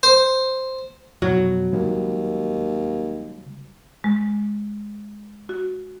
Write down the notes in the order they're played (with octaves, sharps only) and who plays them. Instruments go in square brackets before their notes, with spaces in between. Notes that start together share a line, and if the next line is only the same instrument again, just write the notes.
[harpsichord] C5
[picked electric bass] F2 B2 [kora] F#3
[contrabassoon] D#2 [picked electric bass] C#3 G3 G#3
[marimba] G#3
F#4